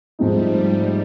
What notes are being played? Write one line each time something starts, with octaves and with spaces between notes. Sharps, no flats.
G#2 F3 G3 A3 C4 D#4